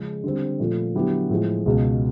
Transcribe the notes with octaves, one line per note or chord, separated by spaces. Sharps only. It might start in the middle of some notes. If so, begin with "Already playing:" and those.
Already playing: C#3 F3 G#3 C#4
D3 G3 C4
A#2 F3 A3
D3 F#3 B3 E4 G4
A2 F3 G#3
C#2 B2 G#3